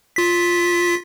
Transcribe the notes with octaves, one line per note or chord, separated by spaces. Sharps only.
F4 B6